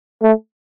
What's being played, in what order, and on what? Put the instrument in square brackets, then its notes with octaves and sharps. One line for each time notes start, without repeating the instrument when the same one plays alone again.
[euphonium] A3